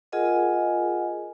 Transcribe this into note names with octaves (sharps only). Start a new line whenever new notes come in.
F4 G#4 A#4 D#5 F#5 G#5